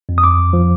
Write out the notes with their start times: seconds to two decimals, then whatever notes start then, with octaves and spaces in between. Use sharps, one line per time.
0.09 F2
0.18 D#6
0.24 D6
0.53 F3